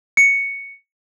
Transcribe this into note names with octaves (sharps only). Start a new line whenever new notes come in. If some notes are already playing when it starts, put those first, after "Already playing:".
C#7